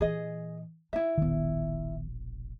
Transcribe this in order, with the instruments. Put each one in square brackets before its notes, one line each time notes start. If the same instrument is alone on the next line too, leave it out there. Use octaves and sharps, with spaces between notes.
[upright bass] A#2 E3 [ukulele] G#4 D#5
[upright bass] D#4 [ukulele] E4 E5
[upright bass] E1 A#1 [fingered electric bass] D#3 B3